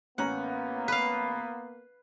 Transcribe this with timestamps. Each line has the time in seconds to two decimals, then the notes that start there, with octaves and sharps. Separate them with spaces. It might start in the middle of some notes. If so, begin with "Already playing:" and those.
0.18 A1 A#3 B3 C#4 F#5 A#5
0.88 B4 F5